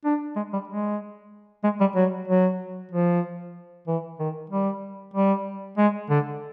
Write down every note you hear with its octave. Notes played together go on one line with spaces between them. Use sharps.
D4
G#3
G3
G#3
G#3
G3
F#3
F#3
F3
E3
D#3
G3
G3
G#3
D3